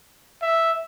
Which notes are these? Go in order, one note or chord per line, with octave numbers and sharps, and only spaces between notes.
E5